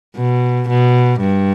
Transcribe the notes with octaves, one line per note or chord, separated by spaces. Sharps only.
B2
B2
G2